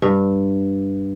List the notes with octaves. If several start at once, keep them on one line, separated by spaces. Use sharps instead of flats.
G2